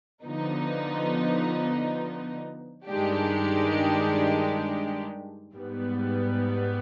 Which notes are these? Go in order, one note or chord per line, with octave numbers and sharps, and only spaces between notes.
D3 F3 B3 D#4
G2 D#3 G#3 D4 G4
G#2 G3 B3